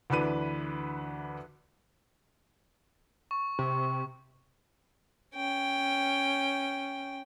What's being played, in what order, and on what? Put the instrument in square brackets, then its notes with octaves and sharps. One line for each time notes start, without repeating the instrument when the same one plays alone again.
[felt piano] D2 E3 D4 B4 D#7
[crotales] C#6
[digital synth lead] C3
[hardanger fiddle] C#4 G5